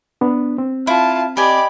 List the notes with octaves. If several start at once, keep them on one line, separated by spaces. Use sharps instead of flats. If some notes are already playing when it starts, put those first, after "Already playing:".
B3 D4
C4
E4 F4 A5
G4 D5 D#5 G#5 B5